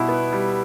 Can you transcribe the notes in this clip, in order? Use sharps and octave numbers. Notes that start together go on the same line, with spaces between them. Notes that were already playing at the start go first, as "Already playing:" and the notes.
Already playing: B2 G3 E4
B3
G3